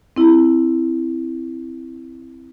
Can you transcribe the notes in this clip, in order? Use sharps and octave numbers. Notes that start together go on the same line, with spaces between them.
C4 E4